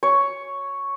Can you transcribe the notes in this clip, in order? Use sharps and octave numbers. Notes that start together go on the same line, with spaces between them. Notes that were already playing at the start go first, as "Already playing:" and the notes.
C#5